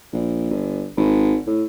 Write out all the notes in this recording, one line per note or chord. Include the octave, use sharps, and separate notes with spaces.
A#1
G1
G#1
A2